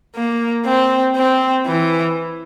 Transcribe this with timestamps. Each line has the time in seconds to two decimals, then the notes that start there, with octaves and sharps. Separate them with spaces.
0.15 A#3
0.66 C4
1.16 C4
1.67 E3